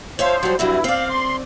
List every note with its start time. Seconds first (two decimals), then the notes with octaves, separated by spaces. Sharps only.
0.19 F3 C5 C#5 E5 F5
0.43 F#3 G3
0.59 G2 F#3 G3 C4 E4
0.84 C4 D5 F5
1.10 C6